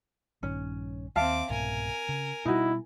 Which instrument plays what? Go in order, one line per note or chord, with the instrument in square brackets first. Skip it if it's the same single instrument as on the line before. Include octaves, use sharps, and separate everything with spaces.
[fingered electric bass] A#1 G2 D#3 [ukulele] C#4
[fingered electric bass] D#2 [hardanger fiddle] C4 D6 [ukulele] E5 F5 A5
[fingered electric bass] C2 G#2 B2 [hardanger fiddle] A#4 G#5
[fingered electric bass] C#3
[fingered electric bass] B2 G3 [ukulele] D#4 F#4 [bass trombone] E4